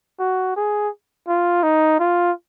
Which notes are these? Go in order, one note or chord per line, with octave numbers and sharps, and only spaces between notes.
F#4
G#4
F4
D#4
F4